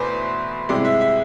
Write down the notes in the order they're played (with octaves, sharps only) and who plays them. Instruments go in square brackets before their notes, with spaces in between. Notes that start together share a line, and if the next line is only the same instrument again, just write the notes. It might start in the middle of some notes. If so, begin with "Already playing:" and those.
Already playing: [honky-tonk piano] E2 B2 A3 B4 C5 D5
C2 C3 G#3 C4 E4 D5
E5
E5